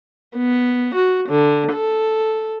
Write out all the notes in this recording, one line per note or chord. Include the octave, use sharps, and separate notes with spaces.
B3
F#4
D3
A4